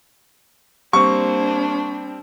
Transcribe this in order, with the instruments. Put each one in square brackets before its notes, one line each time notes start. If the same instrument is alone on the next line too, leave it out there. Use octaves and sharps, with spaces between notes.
[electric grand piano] G3 C4 [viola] A#3 C5 [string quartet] D4 [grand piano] C#6